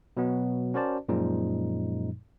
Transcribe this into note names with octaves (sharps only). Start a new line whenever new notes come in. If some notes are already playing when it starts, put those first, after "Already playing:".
B2 F#3 B3
C#4 F#4 A#4 C5 D5 A5
F#2 A#2 F3 G#3 D#4